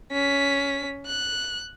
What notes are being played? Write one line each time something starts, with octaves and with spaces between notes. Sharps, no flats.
C#4 B6
F#6